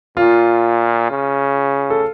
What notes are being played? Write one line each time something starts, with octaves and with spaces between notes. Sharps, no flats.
A#2 F4
C#3
A4